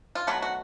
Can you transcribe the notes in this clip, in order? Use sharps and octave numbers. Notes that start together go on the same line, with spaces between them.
F4
B2 F#3 A3 F#4
F#4